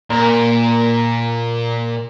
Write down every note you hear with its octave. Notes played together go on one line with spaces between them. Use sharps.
A#2 A#4